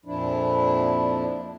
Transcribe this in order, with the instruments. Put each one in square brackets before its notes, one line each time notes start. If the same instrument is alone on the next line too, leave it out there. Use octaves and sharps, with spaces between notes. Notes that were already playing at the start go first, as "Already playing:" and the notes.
[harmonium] F2 A#2 F3 D4 E4